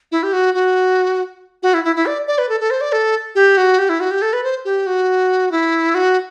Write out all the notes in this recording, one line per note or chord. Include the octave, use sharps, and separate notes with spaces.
E4
G4
F#4
F#4
F#4
E4
E4
E4
D5
D5
B4
A4
A4
C5
D5
A4
G4
F#4
G4
E4
F#4
G4
A4
B4
C5
G4
F#4
E4
F#4